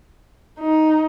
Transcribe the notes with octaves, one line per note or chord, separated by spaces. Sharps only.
D#4